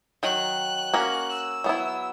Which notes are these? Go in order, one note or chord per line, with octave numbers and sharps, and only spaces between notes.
D#3 F#3 F#6
A#3 C#4 F#4
E6
F#3 B3 E4